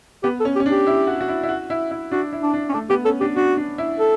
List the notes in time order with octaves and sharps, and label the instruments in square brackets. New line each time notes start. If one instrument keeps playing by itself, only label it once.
[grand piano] B3 [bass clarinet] G4
[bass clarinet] A4
[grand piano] C#4
[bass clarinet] G4
[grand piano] C#4
D4
[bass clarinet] G4
[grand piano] E4
F#4
F#4
E4
E4
F#4
E4
E4
[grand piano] D4 [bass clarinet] F#4
[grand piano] E4
[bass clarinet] D4
[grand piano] D4
[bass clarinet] C#4
[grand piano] A3 [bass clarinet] D4
[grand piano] B3 [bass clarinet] G4
[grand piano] C#4 [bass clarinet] A4
[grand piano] D4 [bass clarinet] G4
[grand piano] D4 [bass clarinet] F#4
[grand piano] D4
E4
[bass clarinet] A4